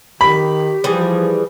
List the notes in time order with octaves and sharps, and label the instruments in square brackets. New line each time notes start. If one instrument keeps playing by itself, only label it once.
[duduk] D#3 [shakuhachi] G4 [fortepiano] B5
[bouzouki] E3 G3 G#4 [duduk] F3